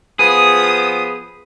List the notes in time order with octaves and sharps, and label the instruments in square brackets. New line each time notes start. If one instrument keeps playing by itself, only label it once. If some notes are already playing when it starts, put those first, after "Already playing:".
[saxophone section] F3 B3 [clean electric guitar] G#4 [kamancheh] D#6